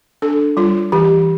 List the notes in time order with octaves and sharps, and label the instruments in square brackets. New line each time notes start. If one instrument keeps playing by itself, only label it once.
[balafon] D4 A4
G3 F4
E3 G4